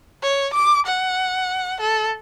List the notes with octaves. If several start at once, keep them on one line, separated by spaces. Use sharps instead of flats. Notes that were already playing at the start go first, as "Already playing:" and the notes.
C#5
D6
F#5
A4